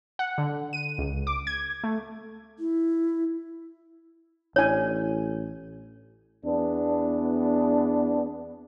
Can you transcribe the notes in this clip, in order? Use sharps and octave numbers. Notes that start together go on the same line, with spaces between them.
F#5
D3
D#7
C#2
D6
G#6
A3
E4
A1 D4 E4 C#5 G#5
E2 B3 D4